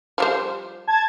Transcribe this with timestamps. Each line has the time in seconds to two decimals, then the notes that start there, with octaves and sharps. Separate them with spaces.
0.18 F3 G3 C5
0.87 A5 G#6